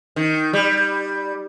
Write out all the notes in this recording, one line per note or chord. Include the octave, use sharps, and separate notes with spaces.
D#3
G3